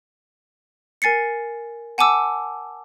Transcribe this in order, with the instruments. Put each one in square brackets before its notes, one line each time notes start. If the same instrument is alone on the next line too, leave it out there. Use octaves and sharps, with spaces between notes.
[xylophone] A#4 G#5 A6 C7 C#7
F#5 G#5 A5 D6 E6